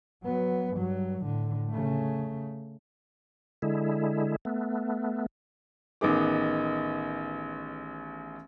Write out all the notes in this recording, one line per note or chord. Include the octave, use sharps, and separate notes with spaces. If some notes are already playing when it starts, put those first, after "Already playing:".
F#3 B3
G2 F#3
A2 D3
C#3 A3
D3 G#3 E4
A3 B3
A1 D#3 B3 D#4 G#4 D6